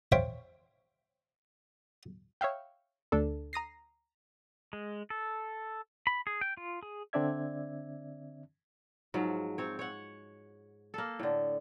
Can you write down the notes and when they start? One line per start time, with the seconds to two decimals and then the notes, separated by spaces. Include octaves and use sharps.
0.12 C5 C#5 E5 F5 G5
2.41 C#5 E5 F5 G5
3.12 D2 D4 A4
3.53 A#5 D#6 A#6 C7
4.73 G#3
5.10 A4
6.07 B5
6.27 G#4
6.41 G5
6.57 F4
6.83 G#4
7.13 D3 C4 D4 D5 E5 G#6
9.14 G#2 F3 F#3
9.58 C4 C#5
9.79 C#5 F#5
10.94 A#3 A4
11.19 A2 D3